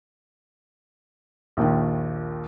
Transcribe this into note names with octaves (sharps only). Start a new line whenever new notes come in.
A#1 D#2 A#2 D#3